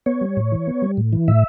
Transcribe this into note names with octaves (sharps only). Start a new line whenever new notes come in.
B3 C#5
G3
A2
E3
B3
G3
A2
E3
A2 E5